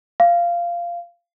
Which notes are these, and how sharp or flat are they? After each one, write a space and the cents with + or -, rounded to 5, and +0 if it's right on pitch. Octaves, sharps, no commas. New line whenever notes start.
F5 -15